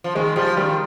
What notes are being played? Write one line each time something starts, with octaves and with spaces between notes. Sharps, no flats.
F3
D#3 G#3
F3 G3
D#3 G3